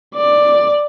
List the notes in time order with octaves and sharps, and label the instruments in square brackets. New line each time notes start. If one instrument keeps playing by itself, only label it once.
[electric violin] D5